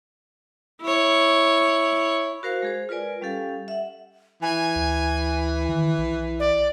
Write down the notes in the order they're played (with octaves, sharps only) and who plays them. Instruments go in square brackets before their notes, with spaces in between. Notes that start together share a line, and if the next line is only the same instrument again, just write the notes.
[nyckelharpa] E4 C#5
[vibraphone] F#4 A#4 C5 F5
G#3 G#4 C5
F4 A#4 B4 D5 G#5
G3 C#4 G4 A4 F5
E5 F#5
[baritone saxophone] E3 [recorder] G#5
[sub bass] D2
D#3
B1
[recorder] D5